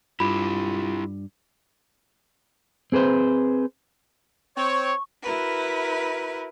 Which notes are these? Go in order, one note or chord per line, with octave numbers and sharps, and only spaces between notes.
G2 E4 F4 G4 B5
C4 G#4 B4 C5
C4 C#5 C#6
E4 F#4 A#4 B4